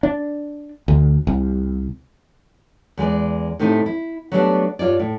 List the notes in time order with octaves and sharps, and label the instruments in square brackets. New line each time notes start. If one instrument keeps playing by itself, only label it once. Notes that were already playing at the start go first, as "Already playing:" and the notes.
[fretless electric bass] D4
D2
C2
[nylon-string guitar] E2 G#3 G#4 D5
A2 C3 A3 D#4 E4
E4
F#3 G3 A3 B3 C#4 D4
G2 F4 C#5 D5
A2